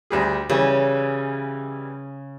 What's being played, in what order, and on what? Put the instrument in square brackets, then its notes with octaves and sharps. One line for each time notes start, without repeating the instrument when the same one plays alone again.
[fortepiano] D2 G3 G#4
[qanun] C#3 [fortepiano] E3 G3